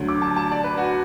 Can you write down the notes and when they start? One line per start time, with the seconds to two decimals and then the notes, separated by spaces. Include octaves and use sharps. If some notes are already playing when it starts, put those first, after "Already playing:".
Already playing: D2 D3 F#3
0.09 D6
0.22 A5
0.36 A5
0.52 D5
0.64 B4
0.78 F#4